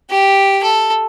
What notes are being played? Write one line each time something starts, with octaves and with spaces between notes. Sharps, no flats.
G4
A4